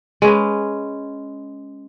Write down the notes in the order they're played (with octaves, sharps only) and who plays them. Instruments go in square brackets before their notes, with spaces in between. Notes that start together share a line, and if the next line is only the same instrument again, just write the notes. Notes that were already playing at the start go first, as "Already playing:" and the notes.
[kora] G#3 C#4 B4